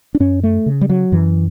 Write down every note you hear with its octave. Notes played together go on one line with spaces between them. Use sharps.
D4
F#2 C#4
A3
C#3
G3
F#3
F#2 E3